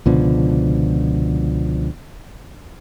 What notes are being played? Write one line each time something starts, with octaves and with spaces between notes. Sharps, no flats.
C#2 B2 D3 F3